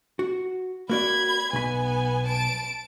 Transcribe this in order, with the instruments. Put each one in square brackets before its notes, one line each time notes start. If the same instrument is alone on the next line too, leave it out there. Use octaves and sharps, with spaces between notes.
[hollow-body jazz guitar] F#4
[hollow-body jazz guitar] A#3 F#4 D5 [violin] B5 G#6
[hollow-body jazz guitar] B1 B5 [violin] B3 G#5
[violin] A5 D7